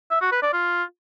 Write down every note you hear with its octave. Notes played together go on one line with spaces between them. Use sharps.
E5
F#4
B4
D5
F4